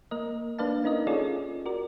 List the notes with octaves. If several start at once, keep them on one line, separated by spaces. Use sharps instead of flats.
A#3 A#4 D#5
A#3 D4 B4 D5 F5 A5
C#4 D#4 A#4 D#5
C#4 F4 G#4 A4 C#5 D5
F#4 A#4 D5